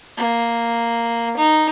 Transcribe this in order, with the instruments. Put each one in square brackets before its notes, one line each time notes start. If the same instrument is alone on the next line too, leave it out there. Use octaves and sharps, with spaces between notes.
[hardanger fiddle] A#3
D#4